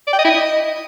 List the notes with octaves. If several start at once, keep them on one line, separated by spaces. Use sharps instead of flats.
D5
G5
D#5
E4
D#5